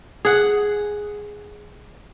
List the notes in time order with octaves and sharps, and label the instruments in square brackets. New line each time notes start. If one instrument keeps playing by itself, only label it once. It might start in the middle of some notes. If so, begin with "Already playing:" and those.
[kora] G#4 F#5